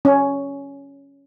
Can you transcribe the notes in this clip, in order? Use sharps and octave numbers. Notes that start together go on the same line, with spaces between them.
C#4